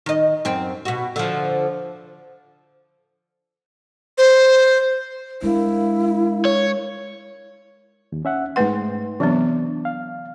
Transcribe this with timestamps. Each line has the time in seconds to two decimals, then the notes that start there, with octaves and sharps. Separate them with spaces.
0.06 D#3 D#5
0.45 F#2 C4
0.85 B2 F#4
1.16 D3 F3
4.18 C5
5.42 G#3 D4 E4 A#4 F5
6.45 C#5
8.12 D#2
8.25 C#4 E5 F#5
8.56 G#2 A3 B4 F#5 C6
9.20 C3 E3 F#3 B3 D4
9.85 F5